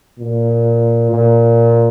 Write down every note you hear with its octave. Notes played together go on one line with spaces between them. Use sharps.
A#2
A#2